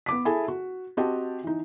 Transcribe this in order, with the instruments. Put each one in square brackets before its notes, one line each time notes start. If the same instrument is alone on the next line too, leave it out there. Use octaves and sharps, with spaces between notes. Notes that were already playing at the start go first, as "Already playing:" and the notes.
[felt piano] B3 D6 B6
E4 G#4 A4 E5 G#5 B5
F#4
C4 F#4 G4 D#5 A5
E3 D#4